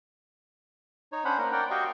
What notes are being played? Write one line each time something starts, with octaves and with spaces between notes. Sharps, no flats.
D#4 C#5
C#4 D4 C5 F#5 B5
A#3 A#4
A#4 D5 F#5 G5
F#4 G4 D#5 F5 G5 C#6